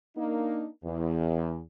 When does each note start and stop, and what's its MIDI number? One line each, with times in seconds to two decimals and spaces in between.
0.17 0.67 58
0.17 0.67 62
0.17 0.67 63
0.84 1.60 40